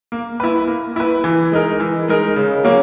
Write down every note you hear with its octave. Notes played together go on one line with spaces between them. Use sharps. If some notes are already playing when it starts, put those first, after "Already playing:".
A#3
E4 B4
A#3
E4 B4
E3
G#3 D#4 A#4
E3
G#3 D#4 A#4
C#3
F#3 A#3 C#4